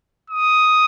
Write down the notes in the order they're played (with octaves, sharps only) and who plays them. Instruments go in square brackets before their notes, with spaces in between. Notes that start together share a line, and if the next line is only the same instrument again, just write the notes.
[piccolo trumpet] D#6